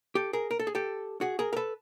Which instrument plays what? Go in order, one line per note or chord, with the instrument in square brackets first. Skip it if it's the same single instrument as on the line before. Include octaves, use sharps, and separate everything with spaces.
[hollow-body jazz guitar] G4 A4
G#4 A#4
A#4
A4
G#4
G4 A4
F#4 G#4
G#4 A#4
A#4
A4 B4